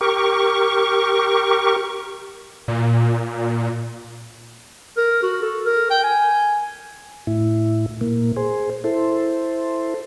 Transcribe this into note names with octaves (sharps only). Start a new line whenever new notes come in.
G4 A#4 C#6
A#2
A#4
F#4
A4
A#4
G5
G#5
A2 E4
A#2 A#3
G#4 C5
E4 A4 C5